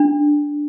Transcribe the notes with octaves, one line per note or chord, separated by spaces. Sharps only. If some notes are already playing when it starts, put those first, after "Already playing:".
Already playing: D4